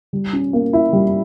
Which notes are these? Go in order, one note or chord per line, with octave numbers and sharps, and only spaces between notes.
G3
C#4
A#3
E4
G3